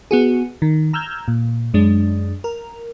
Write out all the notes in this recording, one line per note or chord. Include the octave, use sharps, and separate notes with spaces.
B3 F#4 G#4
D#3
A#5 E6 F6 G6 G#6
A#2
F#2 G#3 D4
A#4